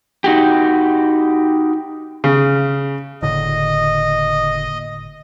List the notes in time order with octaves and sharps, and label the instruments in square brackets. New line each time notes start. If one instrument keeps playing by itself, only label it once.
[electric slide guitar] D#4 F#4 G4
[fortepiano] C#3
[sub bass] F#1 [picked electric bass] A2 D3 [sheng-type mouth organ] D#5